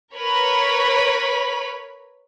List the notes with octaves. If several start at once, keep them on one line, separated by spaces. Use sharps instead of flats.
A#4 B4 C#5 B5